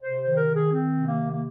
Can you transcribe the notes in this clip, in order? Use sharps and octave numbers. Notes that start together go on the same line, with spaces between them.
C3 C5
C5
D#3
A#4
D#3
G#4
D#3 C4
C3
A#3
D#3
A#3